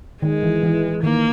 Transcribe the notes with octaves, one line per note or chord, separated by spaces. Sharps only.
D#3 G#3
E3
E3
D#3 A#3